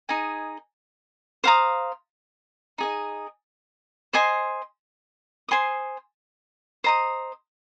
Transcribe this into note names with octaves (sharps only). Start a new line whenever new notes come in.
D#4 G#4 D#5 G#5
C5 F5 A#5 D#6
D#4 G#4 D#5
C5 D#5 G#5 C6
C5 G#5 C6 D#6
C5 D#5 A#5 D#6